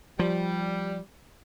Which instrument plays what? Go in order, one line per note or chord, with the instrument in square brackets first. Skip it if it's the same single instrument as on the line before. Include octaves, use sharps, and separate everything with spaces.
[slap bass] F3 [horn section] G3